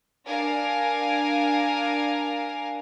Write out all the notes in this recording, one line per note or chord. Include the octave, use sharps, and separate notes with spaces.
D4 A#4 F5 G#5